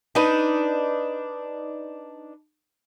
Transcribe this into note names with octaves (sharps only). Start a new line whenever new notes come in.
D4 D#4 B4